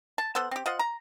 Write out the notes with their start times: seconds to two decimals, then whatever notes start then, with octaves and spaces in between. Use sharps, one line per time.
0.18 A5
0.35 B3 A4 C5 F#5
0.51 C4 G4
0.66 F4 C5 D#5 F#5
0.79 A#5